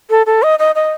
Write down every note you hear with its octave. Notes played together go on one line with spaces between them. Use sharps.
A4
A4
D#5
D#5
D#5